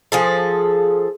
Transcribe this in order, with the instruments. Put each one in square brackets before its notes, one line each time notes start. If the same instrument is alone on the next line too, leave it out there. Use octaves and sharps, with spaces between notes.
[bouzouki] F3 G#4 A4